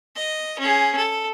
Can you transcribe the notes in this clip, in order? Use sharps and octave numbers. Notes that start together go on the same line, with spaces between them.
D#5
C#4 G#4
A4